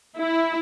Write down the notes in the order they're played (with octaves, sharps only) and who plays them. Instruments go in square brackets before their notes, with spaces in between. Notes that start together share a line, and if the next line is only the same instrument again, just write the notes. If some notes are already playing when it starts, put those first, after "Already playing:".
[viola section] E4